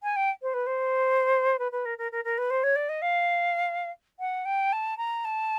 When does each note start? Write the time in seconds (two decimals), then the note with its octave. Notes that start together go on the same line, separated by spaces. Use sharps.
0.03 G#5
0.16 G5
0.42 C5
0.54 B4
0.67 C5
1.59 B4
1.72 B4
1.85 A#4
1.98 A#4
2.12 A#4
2.24 A#4
2.38 B4
2.50 C5
2.63 C#5
2.76 D5
2.89 D#5
3.02 F5
4.20 F#5
4.45 G5
4.73 A5
4.98 A#5
5.25 A5